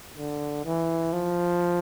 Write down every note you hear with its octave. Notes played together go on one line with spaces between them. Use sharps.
D3
E3
F3